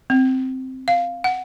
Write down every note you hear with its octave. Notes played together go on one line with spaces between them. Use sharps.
C4
F5
F#5